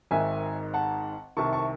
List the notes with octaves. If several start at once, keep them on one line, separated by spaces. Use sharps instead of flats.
G#1 G#2 D#3 E5 G#5
F#5 A5
C2 C3 D#3 A5 C#6
A5 C#6